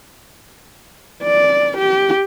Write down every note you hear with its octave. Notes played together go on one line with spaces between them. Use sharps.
D5
G4